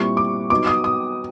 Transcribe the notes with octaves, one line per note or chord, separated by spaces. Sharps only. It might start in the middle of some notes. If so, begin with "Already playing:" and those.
Already playing: A#2 G3 C4 E4 G4 C#6
D6
F#3 B3 D#4 D6
D#6
D#6